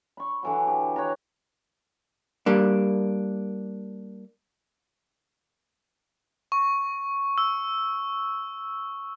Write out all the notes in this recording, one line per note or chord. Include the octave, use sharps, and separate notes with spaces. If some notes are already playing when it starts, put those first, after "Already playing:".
B5 C#6
D3 E3 F#3
G4
C#5 F#5 A#5
G3 A#3 D4
C#6
E6